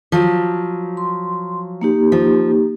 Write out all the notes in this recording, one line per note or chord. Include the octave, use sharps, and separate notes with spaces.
F3 F#3
C6
A#3 D#4 G4
F3